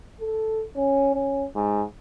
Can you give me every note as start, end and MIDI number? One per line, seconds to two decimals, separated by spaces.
0.21 0.63 69
0.76 1.14 61
1.15 1.46 61
1.56 1.83 44